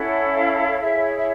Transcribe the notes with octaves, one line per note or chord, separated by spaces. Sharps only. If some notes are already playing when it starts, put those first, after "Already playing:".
Already playing: C#4 E4 A4 C#5 F#5
F5
E4 G#4 C#5 E5
E5